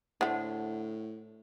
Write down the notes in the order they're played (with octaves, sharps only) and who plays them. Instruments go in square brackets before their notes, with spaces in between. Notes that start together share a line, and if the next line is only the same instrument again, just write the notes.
[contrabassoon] A2 [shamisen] D3 A3 [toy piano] C5 F#5